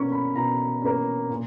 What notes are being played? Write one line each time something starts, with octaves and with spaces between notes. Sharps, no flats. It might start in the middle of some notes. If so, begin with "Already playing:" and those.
Already playing: B2 A#3 C#4 C#6
B5
B2 A#5
A#3 C#4
A#2